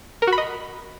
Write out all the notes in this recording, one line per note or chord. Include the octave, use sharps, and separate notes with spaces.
A#4
F#4
B5
D#5